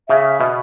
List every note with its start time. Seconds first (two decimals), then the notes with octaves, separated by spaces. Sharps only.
0.09 C#3 E5
0.40 B2